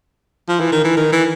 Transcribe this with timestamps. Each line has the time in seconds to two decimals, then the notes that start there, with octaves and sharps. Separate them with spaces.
0.49 F3
0.60 E3
0.72 D#3
0.84 E3
0.97 D#3
1.12 E3